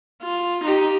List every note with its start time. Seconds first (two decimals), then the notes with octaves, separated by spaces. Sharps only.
0.23 F4
0.64 D#4 G4